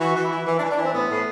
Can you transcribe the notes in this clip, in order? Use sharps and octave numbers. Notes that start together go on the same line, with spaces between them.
E3 F#4
E3
E4
E3
E3
D4
E3
D4
E3 C4
A2 B3
A2